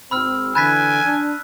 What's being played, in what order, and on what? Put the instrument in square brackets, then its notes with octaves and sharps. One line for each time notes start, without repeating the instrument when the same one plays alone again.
[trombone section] G#1 C4 [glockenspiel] B5 E6 F6
[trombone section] D3 E3 [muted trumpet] G#5 [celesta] B5 [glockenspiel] F#6 A6 B6
[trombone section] D4